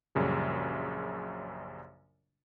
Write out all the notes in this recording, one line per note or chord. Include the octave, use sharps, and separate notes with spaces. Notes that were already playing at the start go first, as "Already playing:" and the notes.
A#1 F#2 C#3 G3